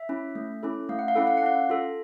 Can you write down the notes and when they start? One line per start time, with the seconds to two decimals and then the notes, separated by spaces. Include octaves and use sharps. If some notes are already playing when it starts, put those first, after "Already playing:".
Already playing: E5
0.09 C#4 E4
0.35 A3
0.63 C#4 E4 A4
0.89 A3 F5
0.99 F#5
1.08 F5
1.16 C#4 E4 A4 F#5
1.27 F5
1.37 F#5
1.42 C#4 F5
1.70 F4 A4